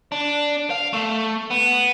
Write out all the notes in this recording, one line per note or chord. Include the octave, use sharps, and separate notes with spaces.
D4
F5
A3
B3